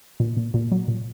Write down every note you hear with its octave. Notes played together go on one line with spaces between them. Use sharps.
A#2
A#2
A#2
F#3
A#2